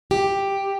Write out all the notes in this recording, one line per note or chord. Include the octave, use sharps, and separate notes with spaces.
G4